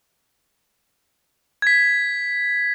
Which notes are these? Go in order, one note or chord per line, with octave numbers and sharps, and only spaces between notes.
G#6 B6